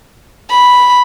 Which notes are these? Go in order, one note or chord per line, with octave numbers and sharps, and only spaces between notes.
B5